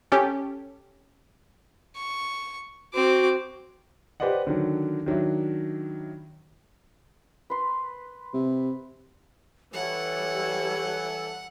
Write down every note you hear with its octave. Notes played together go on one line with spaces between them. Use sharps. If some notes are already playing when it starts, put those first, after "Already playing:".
C#4 G4 A4
C#6
C4 F#4 D6
G4 B4 C5 D5 D#5 F#5
D3 D#3 F#3
D#3 F#3 D4 E4
B4 C6
C3
E3 G3 A4 C#5 F#5